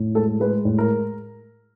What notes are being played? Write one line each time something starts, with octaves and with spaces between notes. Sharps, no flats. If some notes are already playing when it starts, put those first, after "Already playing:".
Already playing: A2
G#3 A4
G#3 B4
A2
A#4